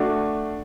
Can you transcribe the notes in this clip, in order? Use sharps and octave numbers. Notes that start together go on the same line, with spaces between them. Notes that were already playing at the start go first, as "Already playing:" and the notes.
Already playing: A3 D4 F#4